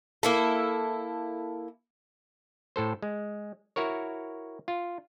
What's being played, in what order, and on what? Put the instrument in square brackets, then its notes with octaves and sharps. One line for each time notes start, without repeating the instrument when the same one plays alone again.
[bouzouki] A#3 E4 A4
[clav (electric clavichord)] A2 A4 C5
G#3
E4 F#4 A#4 C#5
F4